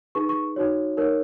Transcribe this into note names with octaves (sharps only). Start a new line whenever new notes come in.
D#4 G#4 B4 C#6
C#6
D#4 F#4 C#5
D#4 A#4 C#5